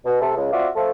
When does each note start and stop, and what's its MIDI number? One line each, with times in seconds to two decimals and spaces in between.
0.05 0.19 47
0.20 0.32 48
0.20 0.32 57
0.20 0.32 69
0.36 0.48 37
0.52 0.68 60
0.52 0.68 65
0.52 0.68 66
0.52 0.68 74
0.52 0.68 76
0.52 0.68 77
0.76 0.90 53
0.76 0.90 57
0.76 0.90 69